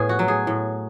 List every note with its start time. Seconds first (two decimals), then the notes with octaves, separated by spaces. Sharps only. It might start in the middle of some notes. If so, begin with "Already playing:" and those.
Already playing: A2 B3 G#4
0.09 F#4
0.19 F#3
0.28 G#4
0.47 A2